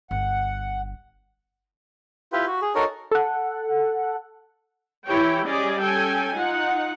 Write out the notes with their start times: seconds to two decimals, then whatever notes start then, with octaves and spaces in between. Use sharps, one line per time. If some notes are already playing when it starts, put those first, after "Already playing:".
0.11 G1 F#5
2.33 E4 F4 G4 B4
2.47 F#4
2.62 G#4
2.75 D#4 F#4 A4 A#4 C#5
3.12 A4 F#5
5.06 E3 E4 G4 C#5 G5
5.47 G3 C#4 G#4 D5 D#5
5.81 C#4 A4 G5 G#5
6.35 D#4 F4 F#5